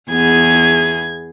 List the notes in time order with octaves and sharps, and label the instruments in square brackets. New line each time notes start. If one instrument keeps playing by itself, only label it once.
[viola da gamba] E2 B3 G#4 [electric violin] G#6